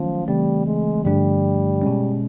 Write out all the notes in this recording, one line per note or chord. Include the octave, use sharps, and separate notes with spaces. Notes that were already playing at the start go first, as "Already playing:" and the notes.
Already playing: D#3 F3 F#3 A3 C#4
C#3 E3 G3 A3 C4
G#3
G2 D3 F3 G3 A3 D4
B2 G#3 C#4